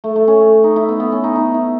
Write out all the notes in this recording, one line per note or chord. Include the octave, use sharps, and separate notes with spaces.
A3
A3
C#4
D#4
E4
B3
B3
C#4
D#4
D#4
E4